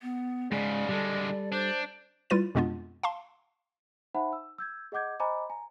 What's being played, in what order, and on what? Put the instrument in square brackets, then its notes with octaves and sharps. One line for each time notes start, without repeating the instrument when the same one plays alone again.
[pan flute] B3
[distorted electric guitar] G#2 C#3 [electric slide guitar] G#3 [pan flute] D5
[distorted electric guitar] D3 G#3 [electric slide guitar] G3 A4
[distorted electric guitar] D4 [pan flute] C5
[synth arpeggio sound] G3 E4 F4 B4 A6 D#7
F2 B2 G#3 B3 D4 F4
F5 A5 C6
[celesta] D#4 C5 E5 F#5 A5 B5
E6
E6 G6 G#6
G#4 D#5 F#5 D6 G6 G#6
C5 D#5 G#5 A#5 B5 D6
G#5 A#5